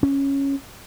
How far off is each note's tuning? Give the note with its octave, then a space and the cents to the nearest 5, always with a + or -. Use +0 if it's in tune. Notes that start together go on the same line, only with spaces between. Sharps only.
C#4 -5